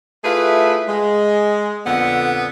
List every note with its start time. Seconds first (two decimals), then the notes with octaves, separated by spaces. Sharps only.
0.25 A3 E4 F4 G#4 B4
0.88 G#3
1.86 F2 A#2 D3 B3